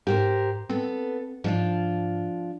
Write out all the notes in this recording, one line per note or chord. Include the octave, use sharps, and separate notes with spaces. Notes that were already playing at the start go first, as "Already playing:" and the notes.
G#2 G4 A#4 C5
B3 C4 A4
G#2 F3 D4 F4